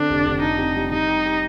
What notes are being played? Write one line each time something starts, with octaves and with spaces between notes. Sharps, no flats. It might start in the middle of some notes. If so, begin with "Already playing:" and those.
Already playing: D3 C4 D4
F1
F1
D4 D#4
C3
G3
G3 D#4
G4
G4